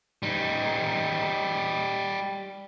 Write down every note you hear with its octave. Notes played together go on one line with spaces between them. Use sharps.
G3 D#4